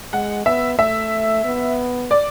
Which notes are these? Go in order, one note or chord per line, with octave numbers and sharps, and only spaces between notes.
G#3 F#5
B3 E5
A3 E5
B3
D5